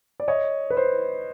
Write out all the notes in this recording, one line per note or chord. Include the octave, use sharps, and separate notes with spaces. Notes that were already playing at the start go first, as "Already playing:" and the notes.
D5
C#5 D#5
B4
C5